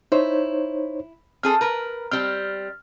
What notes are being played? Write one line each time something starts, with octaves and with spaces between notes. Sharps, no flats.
D#4 E4 C5 C#5
C4 G#4 A4 F6
A#4 B4
G3 C4 F6